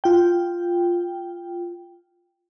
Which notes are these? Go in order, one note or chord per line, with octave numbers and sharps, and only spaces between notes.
F4 G5